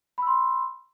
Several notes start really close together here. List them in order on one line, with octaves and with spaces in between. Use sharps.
B5 E6 C6